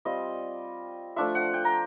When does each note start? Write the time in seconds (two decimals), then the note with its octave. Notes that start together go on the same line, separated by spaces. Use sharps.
0.05 G3 C4 F4 D#5
1.16 F3 A3 D4 F4 E5
1.35 F#5
1.53 G5
1.65 A#5